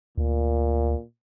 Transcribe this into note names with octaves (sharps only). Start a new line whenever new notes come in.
D2 A#2